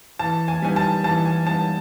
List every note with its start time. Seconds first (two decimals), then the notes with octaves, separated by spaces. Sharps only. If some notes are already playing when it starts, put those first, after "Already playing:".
0.19 E3 A5
0.48 G#5
0.62 G3 B3 D#4 G#5
0.76 A5
1.04 E3 A5
1.25 G#5
1.46 G3 B3 D#4 A5